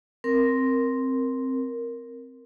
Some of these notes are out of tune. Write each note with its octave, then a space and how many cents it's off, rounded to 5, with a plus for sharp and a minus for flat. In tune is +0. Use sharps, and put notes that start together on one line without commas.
C4 +0 A#4 +0